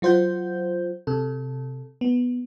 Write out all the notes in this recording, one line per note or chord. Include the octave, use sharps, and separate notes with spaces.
F#3 F4 C5 F#5 G6
C3 A4
B3